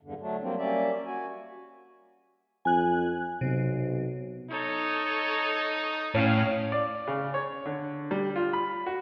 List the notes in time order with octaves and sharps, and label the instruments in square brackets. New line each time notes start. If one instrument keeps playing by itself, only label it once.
[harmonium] E2 G2 D3
F#3 A3 D4
F#3 G3 A#3 C4
G3 A#3 C#4 D5 E5
F#4 G#5
[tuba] F2 [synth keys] G#5 F#6
[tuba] B1 [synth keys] C3
[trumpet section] D#4 [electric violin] A4 C#5
[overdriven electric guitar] A2 [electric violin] C#4 [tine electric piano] C#5 [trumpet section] F5
[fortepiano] D5
C#3
C#5
D3
G3
F4
B5
F#4